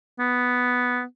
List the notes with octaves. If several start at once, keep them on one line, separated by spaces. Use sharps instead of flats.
B3